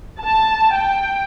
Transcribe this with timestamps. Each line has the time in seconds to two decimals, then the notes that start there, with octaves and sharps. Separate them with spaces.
0.21 A5
0.75 G5